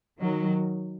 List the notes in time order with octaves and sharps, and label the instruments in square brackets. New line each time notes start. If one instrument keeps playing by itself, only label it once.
[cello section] D#3 F#3